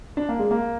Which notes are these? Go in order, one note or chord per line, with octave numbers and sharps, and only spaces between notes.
D4
A#3
G#3
A#3